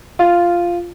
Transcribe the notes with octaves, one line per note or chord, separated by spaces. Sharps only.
F4